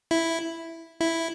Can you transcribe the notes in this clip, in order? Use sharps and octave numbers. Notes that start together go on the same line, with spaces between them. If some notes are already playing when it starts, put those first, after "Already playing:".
E4
E4